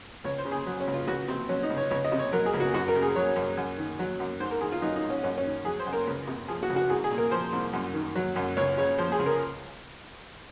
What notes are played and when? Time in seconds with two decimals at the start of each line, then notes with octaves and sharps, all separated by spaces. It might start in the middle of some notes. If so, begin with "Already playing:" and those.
0.24 C#2 C#5
0.38 C5
0.45 C#3
0.52 G#4
0.67 F#3
0.80 C#4
0.87 C#2
0.94 F4
1.07 C#2 F#4
1.28 C3 C4
1.49 F#3 C#4
1.63 D#4
1.70 C#2
1.77 C#5
1.91 C#2 C#5
2.04 D#5
2.12 C3
2.19 C#5
2.32 F#3 A#4
2.46 G#4
2.53 C#2
2.60 F#4
2.74 F#2 F#4
2.88 A#4
2.95 C#3
3.02 G#4
3.16 F#3 C#5
3.36 F#2
3.57 F#2
3.78 D#3
3.99 F#3
4.20 F#2
4.40 G#2 C5
4.51 A#4
4.61 D#3 G#4
4.72 F4
4.82 F#3 D#4
4.96 D#4
5.03 G#2
5.10 C#4
5.24 F#2 C#4
5.37 C#4
5.45 D#3
5.65 F#3 G#4
5.79 C5
5.86 F#2
5.93 A#4
6.07 C#2
6.28 C3
6.48 F3 G#4
6.63 F#4
6.70 C#2
6.76 F#4
6.90 C2 G#4
7.04 G#4
7.11 A#2
7.18 A#4
7.31 F3 C5
7.52 C2
7.73 F#2
7.94 D#3
8.15 F#3
8.36 F#2
8.57 C#2 C#5
8.77 C#3 C#5
8.98 F3 C5
9.12 G#4
9.19 C#2
9.26 A#4